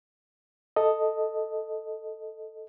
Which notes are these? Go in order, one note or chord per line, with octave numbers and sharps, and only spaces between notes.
A4 D#5